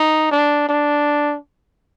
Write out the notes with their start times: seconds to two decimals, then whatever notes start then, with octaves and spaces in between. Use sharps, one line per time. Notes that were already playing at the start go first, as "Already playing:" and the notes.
Already playing: D#4
0.31 D4
0.69 D4